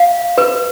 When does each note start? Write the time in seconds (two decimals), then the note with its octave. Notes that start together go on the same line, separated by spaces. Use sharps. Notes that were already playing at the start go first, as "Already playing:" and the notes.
Already playing: F5
0.38 B4